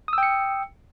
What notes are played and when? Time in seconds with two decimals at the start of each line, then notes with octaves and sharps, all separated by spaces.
0.08 D#6
0.13 E6
0.18 G5
0.23 C#7